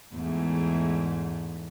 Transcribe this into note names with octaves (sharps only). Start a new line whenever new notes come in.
E2 G#2 A3